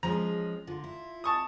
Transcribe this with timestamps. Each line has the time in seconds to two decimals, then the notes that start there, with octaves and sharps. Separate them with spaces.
0.03 F3 G#3 C#4 A#5
0.67 D3 F4
0.84 E4
1.24 A5 C#6 D#6